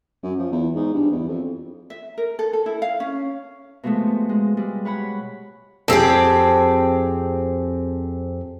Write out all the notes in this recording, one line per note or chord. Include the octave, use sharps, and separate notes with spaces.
F#2
F3
E2
G#2
G2
E2
F2
E5
A#4
A4
A4
E4
F5
C#4
B2 F3 G#3 A3
G#3
G3 G#3
B4 C#5 F#5 B5
F2 C4 G4 G#4